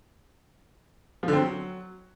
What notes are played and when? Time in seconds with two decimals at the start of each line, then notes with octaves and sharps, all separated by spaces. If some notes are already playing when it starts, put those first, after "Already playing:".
1.23 F3
1.28 D3
1.33 C4
1.38 F#3